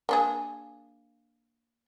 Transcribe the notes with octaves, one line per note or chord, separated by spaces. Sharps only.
A#3 D4 G#4